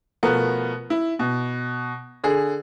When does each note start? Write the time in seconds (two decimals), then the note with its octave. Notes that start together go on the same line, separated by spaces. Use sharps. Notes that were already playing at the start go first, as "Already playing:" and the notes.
0.23 B2 F3 A3 B3 A#4
0.90 E4
1.19 B2
2.24 D3 G#4